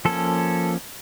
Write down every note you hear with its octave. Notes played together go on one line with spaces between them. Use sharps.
F3 A#3 C#4 A4